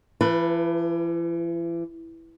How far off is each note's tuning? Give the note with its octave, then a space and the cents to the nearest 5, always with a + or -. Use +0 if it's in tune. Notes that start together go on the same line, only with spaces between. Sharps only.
E3 +40 B4 +0 A5 +25